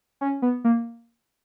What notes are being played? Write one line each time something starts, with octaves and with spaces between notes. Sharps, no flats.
C#4
B3
A#3